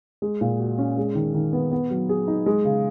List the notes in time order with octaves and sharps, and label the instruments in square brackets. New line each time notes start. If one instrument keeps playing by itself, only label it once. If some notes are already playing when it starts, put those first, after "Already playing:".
[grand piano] G#3
A#2
F#4
C#4
G#3
D#3
D#3
B3
B3
F#3
G#4
D#4
G#3
C#3